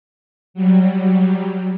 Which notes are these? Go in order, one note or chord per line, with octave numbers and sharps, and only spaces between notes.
F#3 G3